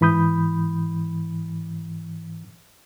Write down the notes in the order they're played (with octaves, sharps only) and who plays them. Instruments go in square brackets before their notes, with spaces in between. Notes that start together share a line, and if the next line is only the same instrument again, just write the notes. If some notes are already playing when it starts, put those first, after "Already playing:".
[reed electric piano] G#2 E3 B5 D#6 G6